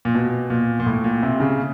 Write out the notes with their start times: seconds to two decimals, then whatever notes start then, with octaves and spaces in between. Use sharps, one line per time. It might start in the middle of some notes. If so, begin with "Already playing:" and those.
0.05 A#2
0.15 B2
0.50 A#2
0.80 A#2
0.86 A2
1.04 A#2
1.23 C3
1.40 C#3